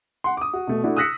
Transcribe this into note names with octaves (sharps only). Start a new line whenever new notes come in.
F#5 C6
D6 D#6
F#4
B2 A3
A3 D4 E4 F#4
D#6 E6 F#6 A#6 B6 C#7